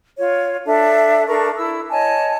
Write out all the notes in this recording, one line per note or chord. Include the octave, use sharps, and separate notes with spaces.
F4 C#5
D4 A4 E5
D4 A4 A#4 C#6
E4 E6
C#5 D#5 G#5 A5